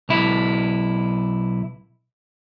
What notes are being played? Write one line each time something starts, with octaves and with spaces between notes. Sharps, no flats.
B1 E4